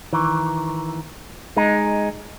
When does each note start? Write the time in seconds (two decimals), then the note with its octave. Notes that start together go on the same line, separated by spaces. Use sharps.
0.13 D#3 E3
1.57 G#3 D#4